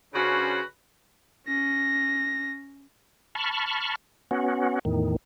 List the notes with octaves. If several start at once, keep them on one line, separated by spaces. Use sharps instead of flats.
C#3 C#4 D4 F#4 B4 C5
C#4 A#6
A5 B5 C#6 F6
B3 C#4 F#4
E2 A2 D#3